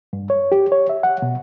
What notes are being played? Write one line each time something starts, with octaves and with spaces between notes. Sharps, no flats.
G2
C#5
G4
C#5
E5
F#5
B2